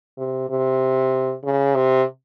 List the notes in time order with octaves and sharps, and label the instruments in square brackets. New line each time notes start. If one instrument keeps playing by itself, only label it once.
[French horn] C3
C3
C#3
C3